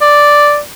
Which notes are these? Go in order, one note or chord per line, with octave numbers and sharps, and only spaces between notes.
D5